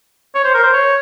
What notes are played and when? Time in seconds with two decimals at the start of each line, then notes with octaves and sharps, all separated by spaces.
0.35 C#5
0.44 C5
0.54 A#4
0.63 C5
0.73 C#5